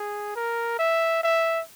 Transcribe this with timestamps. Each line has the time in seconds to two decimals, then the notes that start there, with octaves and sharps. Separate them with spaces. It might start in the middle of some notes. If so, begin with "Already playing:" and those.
Already playing: G#4
0.36 A#4
0.79 E5
1.23 E5